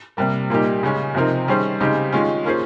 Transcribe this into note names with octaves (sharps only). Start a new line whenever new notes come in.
C3 G3 A#3
A#2 G3 A#3 D#4 G4
C#3 G#3 C#4
C3 F3 C4 D#4 A#4
D#3 G3 C#4 G#4 C5
C#3 G#3 C4 D#4 G4
D#3 G#3 C#4 F4
A#3 C#4 F4 G#4 C5